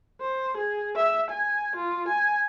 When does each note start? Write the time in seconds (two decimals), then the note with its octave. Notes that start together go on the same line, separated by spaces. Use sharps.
0.21 C5
0.57 G#4
0.96 E5
1.30 G#5
1.76 F4
2.09 G#5